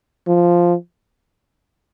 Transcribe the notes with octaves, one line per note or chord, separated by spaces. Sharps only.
F3